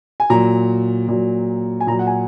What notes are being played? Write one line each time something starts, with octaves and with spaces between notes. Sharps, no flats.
G#5
A#2 F#3 A#5
A#2 F#3
G#5
A#2 F#3 A#5
F#5
G#5